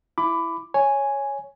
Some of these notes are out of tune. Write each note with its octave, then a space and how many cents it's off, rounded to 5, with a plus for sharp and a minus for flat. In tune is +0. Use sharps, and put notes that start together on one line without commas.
E4 +10 B5 +20 D6 +0
C#5 +0 G#5 +0